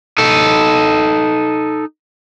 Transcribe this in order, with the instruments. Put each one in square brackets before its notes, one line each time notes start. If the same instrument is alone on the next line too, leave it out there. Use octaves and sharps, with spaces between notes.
[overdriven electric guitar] D#4 A4